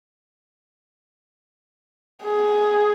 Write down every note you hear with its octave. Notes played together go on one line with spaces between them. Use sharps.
G#4